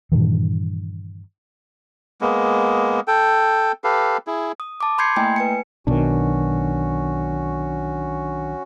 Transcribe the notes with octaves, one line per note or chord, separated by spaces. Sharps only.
G2 A#2 D#3 E3
G#3 A#3 B3
A4 G5
G4 A4 B4 F5
E4 G#4
D#6
A5 D6
B5 C6 G6 G#6 C7 C#7
A3 A#3 E4 G5 G#5
B4 G#5 C#7
B1 B2 D#3 C#4 D4 F#4